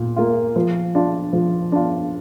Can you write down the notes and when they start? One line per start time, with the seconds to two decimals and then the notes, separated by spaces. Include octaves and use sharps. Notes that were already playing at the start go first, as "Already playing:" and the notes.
Already playing: A#2
0.16 A#3 F4
0.56 F3
0.95 D4 F4
1.33 F3
1.72 D4 F4